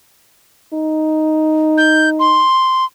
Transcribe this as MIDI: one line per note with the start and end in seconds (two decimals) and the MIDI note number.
0.73 2.45 63
1.78 2.10 91
2.20 2.85 84